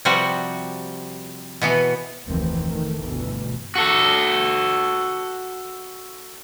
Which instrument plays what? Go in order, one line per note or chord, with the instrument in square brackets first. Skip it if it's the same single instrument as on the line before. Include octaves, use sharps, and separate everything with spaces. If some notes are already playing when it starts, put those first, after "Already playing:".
[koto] C3 F3 G3 F#4
B2 E3 B3
[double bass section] F1 D2 A2 D#3 E3 C4
D#3 A3
G1 D2 B2 E3
[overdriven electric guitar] F#4 A4